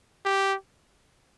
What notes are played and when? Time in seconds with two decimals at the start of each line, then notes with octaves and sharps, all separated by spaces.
0.25 G4